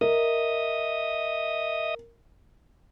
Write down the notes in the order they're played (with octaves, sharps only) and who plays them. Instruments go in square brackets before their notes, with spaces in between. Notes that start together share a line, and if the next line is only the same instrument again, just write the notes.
[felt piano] A#4 [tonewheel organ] D#5 E5 D#6